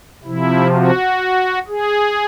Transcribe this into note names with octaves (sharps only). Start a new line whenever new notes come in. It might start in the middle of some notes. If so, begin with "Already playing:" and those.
C3 F3 E4
F#4
G#4